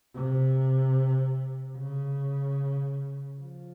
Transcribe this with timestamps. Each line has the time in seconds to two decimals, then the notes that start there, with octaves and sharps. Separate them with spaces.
0.15 C3
1.77 C#3
3.41 F3